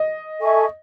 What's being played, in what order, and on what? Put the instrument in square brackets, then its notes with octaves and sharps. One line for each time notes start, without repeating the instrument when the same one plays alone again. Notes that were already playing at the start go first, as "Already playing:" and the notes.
Already playing: [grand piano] D#5
[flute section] A4 E5 G#5 C#6